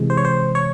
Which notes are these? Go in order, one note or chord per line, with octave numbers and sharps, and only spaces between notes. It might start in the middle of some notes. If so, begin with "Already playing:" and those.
Already playing: C3 E3 G#3
C5
C#5
C5
C#5